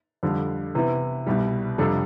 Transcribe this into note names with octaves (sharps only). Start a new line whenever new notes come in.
F2 D3 G3
C3 E3 B3 E4
C2 B2 G3
F2 C3 G3 D4 A4